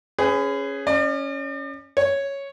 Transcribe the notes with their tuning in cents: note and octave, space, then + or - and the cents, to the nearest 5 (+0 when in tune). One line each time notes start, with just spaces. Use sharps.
C#4 +0 G#4 +0 B4 +35
C#4 +0 D5 +45
C#5 +0 C#6 +0